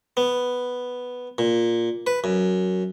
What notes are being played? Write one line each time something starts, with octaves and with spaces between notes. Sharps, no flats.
B3
A#2
B4
F#2